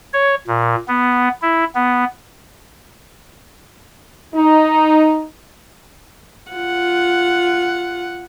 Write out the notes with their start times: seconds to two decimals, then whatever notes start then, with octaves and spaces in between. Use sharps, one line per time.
0.13 C#5
0.47 A#2
0.88 B3
1.42 E4
1.75 B3
4.35 D#4
6.52 F4 F#5